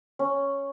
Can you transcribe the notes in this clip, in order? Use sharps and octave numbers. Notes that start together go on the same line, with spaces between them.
C#4